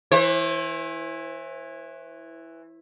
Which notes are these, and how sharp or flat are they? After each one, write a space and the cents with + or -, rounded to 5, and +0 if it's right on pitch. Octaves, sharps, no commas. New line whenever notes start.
E3 +0 C5 +45